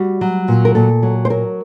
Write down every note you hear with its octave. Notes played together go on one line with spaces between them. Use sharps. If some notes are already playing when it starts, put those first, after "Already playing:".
Already playing: G3 F#4
F#3
A#2
A#4
A#2 A4
F#3
C5
F#3 A#4